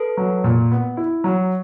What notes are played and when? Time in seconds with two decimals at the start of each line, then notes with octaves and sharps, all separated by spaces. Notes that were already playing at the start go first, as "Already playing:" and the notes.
Already playing: A4 B4
0.17 F#3
0.44 A#2
0.71 B3
0.97 E4
1.24 F#3